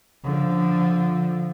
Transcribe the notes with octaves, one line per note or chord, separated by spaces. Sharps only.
D3 F3